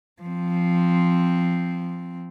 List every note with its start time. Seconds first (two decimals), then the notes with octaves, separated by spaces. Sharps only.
0.22 F3 C4